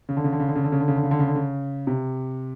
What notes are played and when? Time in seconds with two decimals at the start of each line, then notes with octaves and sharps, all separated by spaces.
0.09 C#3
0.17 D3
0.24 C#3
0.33 D3
0.40 C#3
0.48 D3
0.55 C#3
0.64 D3
0.72 C#3
0.80 D3
0.88 C#3
0.96 D3
1.03 C#3
1.11 D3
1.19 C#3
1.27 D3
1.35 C#3
1.87 C3